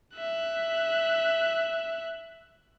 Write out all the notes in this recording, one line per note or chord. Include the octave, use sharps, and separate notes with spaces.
E5 F#6